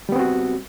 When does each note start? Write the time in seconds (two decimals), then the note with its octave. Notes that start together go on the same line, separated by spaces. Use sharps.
0.09 G3
0.12 B3
0.16 C4
0.19 F#4